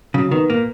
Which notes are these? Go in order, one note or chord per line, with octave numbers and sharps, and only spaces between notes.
C#3 F#3
D#3 B3
A#2 A#3